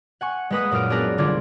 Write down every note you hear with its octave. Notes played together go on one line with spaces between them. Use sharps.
F#5 G#5 C#6
G#3 A#3 B4 F#5 D#6 B6
F#2 A#2 D#6 F6 D7
B3 D4 F#4 G#4 A#4 B4
C2 D3 D4 F4 D6 G#6